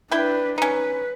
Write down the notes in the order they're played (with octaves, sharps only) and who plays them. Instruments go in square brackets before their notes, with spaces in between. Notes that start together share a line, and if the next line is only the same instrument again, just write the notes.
[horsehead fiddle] D4 B4 [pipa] E4 G5
[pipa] C#4 D#4 [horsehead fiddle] B4